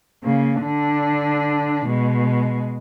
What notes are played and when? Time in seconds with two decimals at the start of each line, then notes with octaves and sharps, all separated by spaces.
0.23 C#3 A#3
0.62 D3 D4
1.86 B2 G#3